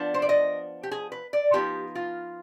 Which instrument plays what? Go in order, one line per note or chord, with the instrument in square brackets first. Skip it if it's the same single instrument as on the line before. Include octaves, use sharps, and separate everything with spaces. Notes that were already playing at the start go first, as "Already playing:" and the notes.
Already playing: [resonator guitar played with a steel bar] F3 B3 D4
C5
D5
D#5
G4
G#4
B4
D5
F3 B3 D#4 G4
F4